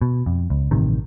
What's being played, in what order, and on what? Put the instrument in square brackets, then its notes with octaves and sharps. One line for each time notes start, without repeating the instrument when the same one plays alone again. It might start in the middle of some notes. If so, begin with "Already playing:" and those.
[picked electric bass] B2
F2
C#2
A1 G2 C3 D#3